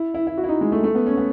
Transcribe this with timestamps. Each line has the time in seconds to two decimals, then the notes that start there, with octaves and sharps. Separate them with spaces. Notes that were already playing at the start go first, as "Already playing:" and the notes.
Already playing: E4
0.14 E4
0.27 E4
0.37 F#4
0.44 E4
0.49 D#4
0.61 G#3
0.72 A3
0.84 A3
0.95 B3
1.06 C#4
1.17 B3